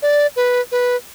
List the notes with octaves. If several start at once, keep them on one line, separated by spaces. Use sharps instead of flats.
D5
B4
B4